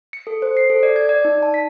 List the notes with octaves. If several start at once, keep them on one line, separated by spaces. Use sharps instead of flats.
C#7
A4
C5
C7
A4
D5
G#6
D5
D#4
A5
B6